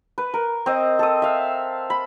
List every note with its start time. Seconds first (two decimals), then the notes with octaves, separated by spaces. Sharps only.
0.18 B4
0.34 A#4
0.66 C4 D#5
0.99 A4 D#6
1.22 E5 F5
1.90 B5